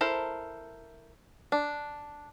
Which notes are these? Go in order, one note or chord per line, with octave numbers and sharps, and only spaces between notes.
E4 A4 A#4 C5
D4